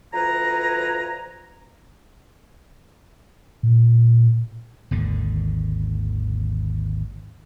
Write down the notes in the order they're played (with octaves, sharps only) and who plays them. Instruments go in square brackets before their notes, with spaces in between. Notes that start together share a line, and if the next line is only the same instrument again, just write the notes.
[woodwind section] D2 F3 B4 G#5 A#5
[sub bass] A#2
[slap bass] G#1 D#2 D3